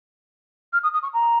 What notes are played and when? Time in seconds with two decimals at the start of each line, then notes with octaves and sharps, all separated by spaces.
0.73 F6
0.83 D#6
0.93 D#6
1.03 C#6
1.13 A#5